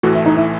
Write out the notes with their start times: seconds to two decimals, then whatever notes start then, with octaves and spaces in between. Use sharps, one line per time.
0.03 A1 A2 E3 A3 F#4
0.14 E4
0.26 D#4
0.36 E4